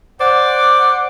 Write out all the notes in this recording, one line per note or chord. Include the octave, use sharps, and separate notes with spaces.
C5 D5 F#5